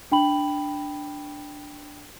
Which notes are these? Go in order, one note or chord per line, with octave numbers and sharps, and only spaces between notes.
D4 G5 B5 F#7